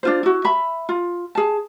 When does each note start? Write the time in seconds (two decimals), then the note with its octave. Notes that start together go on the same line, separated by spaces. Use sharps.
0.03 D4 F4 C5
0.23 E4 F#4
0.45 E5 B5
0.89 F4
1.35 G#4 A5